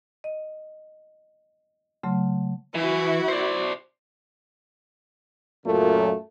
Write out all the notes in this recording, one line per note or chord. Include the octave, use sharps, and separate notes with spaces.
D#5
C#3 F#3 A3 C6
E3 E4 F#4
C5 D5
F#2 A#2 C#3 A3